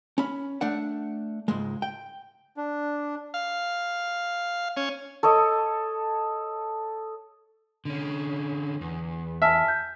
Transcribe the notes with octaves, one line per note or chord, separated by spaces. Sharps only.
C#4 B5
A3 D4 F#5
C#2 G#2 G#3
G5
D4
F5
C#4
A4 C#5 D#5 D6
D3 C#4
E2
E5 G#5 A5 F6
G6